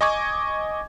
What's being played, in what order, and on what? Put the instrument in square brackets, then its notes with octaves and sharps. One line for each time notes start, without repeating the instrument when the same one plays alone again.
[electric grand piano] D#5 G#5 C#6 D6 G#6